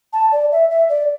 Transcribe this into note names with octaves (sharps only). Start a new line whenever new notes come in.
A5
D5
E5
E5
D5